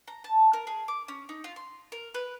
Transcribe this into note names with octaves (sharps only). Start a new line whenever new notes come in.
A#5
A5
A#4
G#4
D6
C#4
D#4
F4
C6
A#4
B4